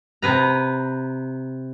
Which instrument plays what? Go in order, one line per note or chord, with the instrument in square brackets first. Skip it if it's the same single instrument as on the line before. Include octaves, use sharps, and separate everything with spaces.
[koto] C3 B4 A#5